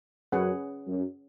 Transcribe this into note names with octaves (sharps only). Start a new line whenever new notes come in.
F#2 C#4 G#4 B4 F#5
F#2